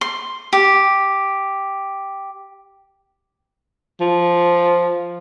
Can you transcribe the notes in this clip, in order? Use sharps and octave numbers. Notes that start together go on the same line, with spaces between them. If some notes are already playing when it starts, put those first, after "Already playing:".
C6
G4
F3